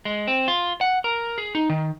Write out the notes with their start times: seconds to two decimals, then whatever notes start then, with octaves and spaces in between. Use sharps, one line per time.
0.05 G#3
0.27 C4
0.48 F4
0.81 F#5
1.04 A#4
1.38 G#4
1.55 D#4
1.69 D#3